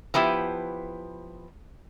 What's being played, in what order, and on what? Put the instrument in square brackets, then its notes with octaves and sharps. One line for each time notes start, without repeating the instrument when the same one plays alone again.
[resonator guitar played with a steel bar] F3 B3 E4 G4